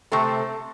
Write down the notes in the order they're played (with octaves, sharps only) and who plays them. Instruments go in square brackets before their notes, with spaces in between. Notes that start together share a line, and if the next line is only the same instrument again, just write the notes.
[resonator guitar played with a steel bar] C3 A3 C4 A4